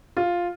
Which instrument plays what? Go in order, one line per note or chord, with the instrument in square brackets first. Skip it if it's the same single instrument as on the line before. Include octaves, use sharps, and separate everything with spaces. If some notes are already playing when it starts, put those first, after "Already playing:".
[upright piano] F4